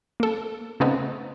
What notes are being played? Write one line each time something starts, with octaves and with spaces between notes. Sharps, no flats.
A#3 A4
C#3 A3 B3 C4 D#4